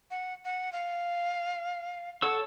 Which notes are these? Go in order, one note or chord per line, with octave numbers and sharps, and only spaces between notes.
F#5
F#5
F5
A4 C#5 F#5 E6